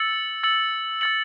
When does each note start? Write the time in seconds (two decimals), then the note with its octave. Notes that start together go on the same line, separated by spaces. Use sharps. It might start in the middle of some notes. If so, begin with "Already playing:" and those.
Already playing: E6 A6 C#7 F#7
0.43 E6 A6 C#7 F#7
1.01 E6 A6 C#7 F#7